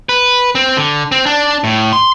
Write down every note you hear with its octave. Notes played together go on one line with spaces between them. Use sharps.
B4
C4
D3
C4
D4
A2
C6